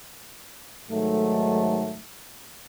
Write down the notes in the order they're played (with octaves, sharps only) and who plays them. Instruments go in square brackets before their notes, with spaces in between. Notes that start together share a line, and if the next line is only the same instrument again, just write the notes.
[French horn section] G#2 D#3 F#3 A3